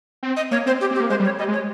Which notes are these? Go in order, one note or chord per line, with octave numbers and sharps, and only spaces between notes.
C4
D#5
A#3 C#5
C4 C5
G4
C4
G4
A#3
G#3 C5
G3
C#5
G3 D#5
G#3
C#5